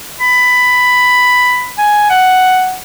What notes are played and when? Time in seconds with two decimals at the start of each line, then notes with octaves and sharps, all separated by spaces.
0.20 B5
1.78 G#5
2.10 F#5